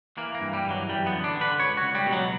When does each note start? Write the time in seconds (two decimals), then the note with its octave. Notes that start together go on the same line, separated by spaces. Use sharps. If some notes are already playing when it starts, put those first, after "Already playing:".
0.17 E3 A#3
0.35 A#3
0.41 G2
0.53 G3
0.65 E3
0.70 F#3
0.88 F#2 G3
1.06 B3
1.12 D3
1.24 D4
1.36 D3
1.41 B4
1.59 C#2 C#5
1.77 F#4
1.83 C#2
1.95 G3
2.06 B2
2.13 F#3